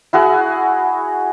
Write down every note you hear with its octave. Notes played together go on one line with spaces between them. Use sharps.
E4 F#4 G#4 F#5